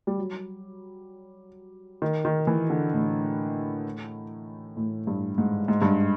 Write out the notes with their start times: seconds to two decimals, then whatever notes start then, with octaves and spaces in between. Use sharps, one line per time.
0.07 G3
0.18 F#3
2.02 D#3
2.25 D#3
2.47 E3
2.70 D3
2.93 A2
4.77 A2
5.07 G2
5.38 G#2
5.68 G#2
5.82 G2